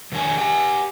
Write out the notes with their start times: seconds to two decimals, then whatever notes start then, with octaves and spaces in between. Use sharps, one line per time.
0.12 F2 D#3 D4 C#5 G#5
0.38 G4 F#5 G#5